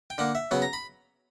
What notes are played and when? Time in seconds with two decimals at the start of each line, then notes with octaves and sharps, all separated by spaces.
0.10 G5
0.18 D3 A#3 F#5
0.35 E5
0.51 C#3 F#3 B3 F#5
0.62 A#5
0.73 B5